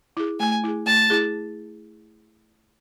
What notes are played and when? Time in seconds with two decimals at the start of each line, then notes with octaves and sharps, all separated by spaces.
0.17 E4 G#4
0.40 A3 G#5
0.64 E4 G#4
0.86 A3 A5
1.10 E4 G#4